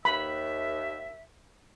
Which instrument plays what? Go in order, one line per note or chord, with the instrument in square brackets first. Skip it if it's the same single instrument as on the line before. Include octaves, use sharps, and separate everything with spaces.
[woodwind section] D#2 E5 [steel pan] B5